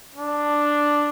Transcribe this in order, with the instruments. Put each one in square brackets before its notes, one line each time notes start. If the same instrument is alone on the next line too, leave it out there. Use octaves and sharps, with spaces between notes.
[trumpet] D4